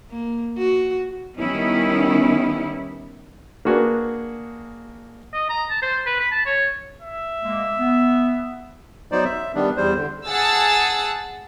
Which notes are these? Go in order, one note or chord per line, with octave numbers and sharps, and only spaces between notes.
A#3
F#4
D#3 G3 B3 C#4 D#4 E4
A#3 D4 F#4 G#4 A#4 B4
D#5
A#5
A5
C5
B4
B5
A5
C#5
E5
G#3 A#3
B3
F#3 B3 D#4 C5 D5
E5
D#3 G3 B3 D4
E2 G3 C5
D3
G#4 F#5 A5 E6 A6